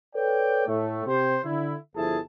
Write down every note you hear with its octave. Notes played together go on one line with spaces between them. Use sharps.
A4 B4 C#5 D5 G5
A2 A3
C3 G4 C5
D3 E4
G1 F3 E4 G#4 A4 A5